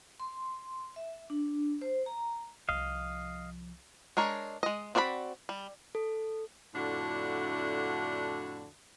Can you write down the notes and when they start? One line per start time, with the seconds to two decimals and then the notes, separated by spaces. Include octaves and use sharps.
0.20 C6
0.96 E5
1.30 D4
1.81 C5
2.06 A#5
2.69 C2 F3 D#5 F5
4.17 G#3 D4 A#4 C#5
4.63 G#3 D#5
4.95 C4 F#4 D5 F5 B5
5.49 G3
5.95 A4
6.74 F2 A2 D3 D4 E4 F#4